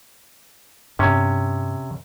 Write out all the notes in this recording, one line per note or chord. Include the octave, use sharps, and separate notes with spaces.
G2 C3 C#4 D4